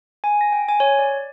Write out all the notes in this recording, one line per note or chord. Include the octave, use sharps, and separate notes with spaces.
G#5
A#6
G5
G#5
C#5
D5